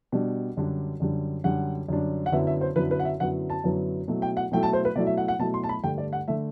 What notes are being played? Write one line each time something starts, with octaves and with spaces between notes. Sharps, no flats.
B2 G3 D4
F#2 D3 G3 D4
F#2 D3 G3 D4
F#2 D3 G3 D4 F#5
F#2 D3 G3 D4
F#5
F#2 D3 F#3 B3 E4 E5
E5
C5
F#2 D3 F#3 B3 E4 B4
B4
F#5
E5
F#2 D3 F#3 B3 E4 F#5
A5
F#2 D3 F#3 B3 E4
B2 F#3 A3 E4
G5
F#5
B2 F#3 A3 E4 G5
A5
C5
B4
B2 F#3 A3 E4 D5
E5
F#5
F#5
B2 F#3 A3 E4 A5
C6
A5
B5
G2 D3 A3 G5
D5
F#5
D3 A3 E5